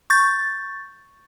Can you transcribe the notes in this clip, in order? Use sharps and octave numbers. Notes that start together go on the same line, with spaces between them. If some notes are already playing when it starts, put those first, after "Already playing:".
C#6 G6 A6